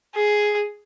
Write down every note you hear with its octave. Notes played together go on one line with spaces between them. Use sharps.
G#4